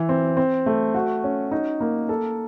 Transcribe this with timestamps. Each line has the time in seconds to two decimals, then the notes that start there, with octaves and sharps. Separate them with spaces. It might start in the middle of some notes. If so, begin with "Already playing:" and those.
Already playing: E3
0.09 C4
0.37 C4
0.66 A3
0.94 F#4
1.24 C#4
1.51 D#4
1.80 A#3
2.09 A4